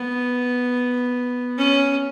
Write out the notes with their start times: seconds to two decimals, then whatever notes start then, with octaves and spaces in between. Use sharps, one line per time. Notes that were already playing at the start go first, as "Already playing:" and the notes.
Already playing: B3
1.58 C#4